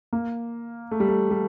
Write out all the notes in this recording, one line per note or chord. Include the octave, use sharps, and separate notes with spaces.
A#3
A3
G3
A3
G3